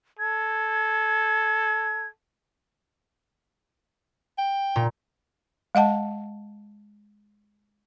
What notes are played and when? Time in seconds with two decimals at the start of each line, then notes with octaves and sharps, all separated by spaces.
0.19 A4 G#6
4.38 G5
4.76 A#2
5.75 G#3 D#5 F#5 A5